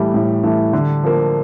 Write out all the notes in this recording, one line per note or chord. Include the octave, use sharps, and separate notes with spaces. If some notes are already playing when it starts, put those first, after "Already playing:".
Already playing: A2 E3 G3 A3 G4
A2
E3 A3
D3
F3 A#3